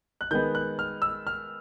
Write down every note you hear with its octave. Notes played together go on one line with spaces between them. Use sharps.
F#6
D#3 G#3 B3 G6
F#6
F6
E6
F6